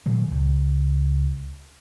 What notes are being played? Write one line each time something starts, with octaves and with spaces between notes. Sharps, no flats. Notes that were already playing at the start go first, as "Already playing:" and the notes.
A#2 D#3 F#3 G#3
C#2